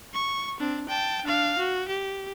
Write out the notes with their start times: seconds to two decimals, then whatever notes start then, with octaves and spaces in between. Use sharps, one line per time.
0.14 C#6
0.60 C4 D4
0.89 G5 A5
1.24 D4 F5
1.58 F#4
1.88 G4